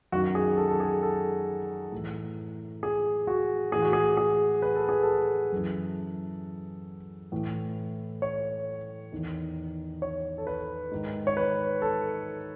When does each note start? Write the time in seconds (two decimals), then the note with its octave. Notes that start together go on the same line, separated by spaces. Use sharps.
0.12 F#2 D#3 F#4
0.35 G#4
0.57 A4
0.69 A4
0.80 G#4
1.02 A4
1.92 A2 E3
2.83 G#4
3.27 F#4
3.72 A2 E3 G#4
3.82 F#4
3.93 G#4
4.17 G#4
4.62 B4
4.76 A4
4.89 G#4
5.03 A4
5.52 F#2 E3
7.32 A2 E3
8.22 C#5
9.12 E2 D#3
10.02 C#5
10.38 A4
10.47 B4
10.91 G#2 D#3
11.27 C#5
11.37 B4
11.82 A4